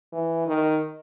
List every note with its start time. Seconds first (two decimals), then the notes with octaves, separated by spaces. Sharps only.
0.13 E3
0.47 D#3